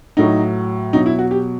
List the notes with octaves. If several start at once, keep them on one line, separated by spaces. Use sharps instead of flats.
A2 F#3 D#4
B2 F#3 D#4
E4
F#4
G4